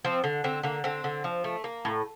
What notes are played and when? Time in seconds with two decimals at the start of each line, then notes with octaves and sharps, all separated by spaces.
0.05 F3 C4
0.24 D3
0.44 D3 C4
0.63 D3 A#3
0.84 D3 C4
1.04 D3
1.24 F3
1.44 A3
1.64 A#3
1.85 A2